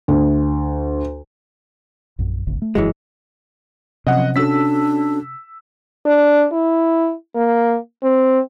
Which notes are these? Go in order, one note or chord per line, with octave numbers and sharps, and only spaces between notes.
D2
A#1 F#2
D#1 G#1 D2
A3
F1 F#2 E3 F#3 G#3
C3 F3 F#3 C#4 D#5 F#5
C#4 D4 F#4 A4 E6 B6
D4
E4
A#3
C4